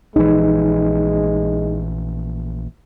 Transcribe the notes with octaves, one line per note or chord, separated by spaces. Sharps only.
A#1 E3 G#3 D#4